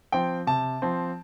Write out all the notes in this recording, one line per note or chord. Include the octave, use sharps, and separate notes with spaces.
F3 C4 G5
C3 A5
F3 C4